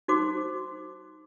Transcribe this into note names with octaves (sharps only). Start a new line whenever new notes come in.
D#4 F#4 C5 D6